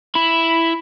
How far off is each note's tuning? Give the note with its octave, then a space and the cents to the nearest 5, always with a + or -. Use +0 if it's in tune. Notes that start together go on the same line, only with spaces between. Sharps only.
E4 +5 B5 +0